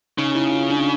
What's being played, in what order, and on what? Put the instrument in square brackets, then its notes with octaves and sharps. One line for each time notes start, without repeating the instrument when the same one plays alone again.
[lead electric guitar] C#3 [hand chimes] D#4
[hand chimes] E4
F4
D4
D#4